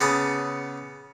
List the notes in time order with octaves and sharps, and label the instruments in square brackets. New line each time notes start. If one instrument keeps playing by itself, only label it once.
[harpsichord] C#3 B3 A5 D6 D#6